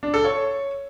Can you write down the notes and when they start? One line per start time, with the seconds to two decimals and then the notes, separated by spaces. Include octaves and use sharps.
0.03 D4
0.14 A4
0.24 C#5